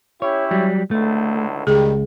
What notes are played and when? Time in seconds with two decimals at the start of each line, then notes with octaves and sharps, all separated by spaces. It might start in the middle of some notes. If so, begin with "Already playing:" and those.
0.22 C#4 E4 G4 C#5
0.51 F#3 G3
0.91 C#2 A2 D3 A3
1.67 C#2 D#3 G3 G#4